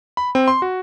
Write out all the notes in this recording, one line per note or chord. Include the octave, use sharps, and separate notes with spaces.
B5
C4
C6
F#4